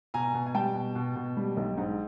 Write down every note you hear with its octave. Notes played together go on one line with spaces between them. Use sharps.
B2 G#5 A#5
B2
G#5
G3 G5 A5
B2
B2
B2
G3
B1
G#2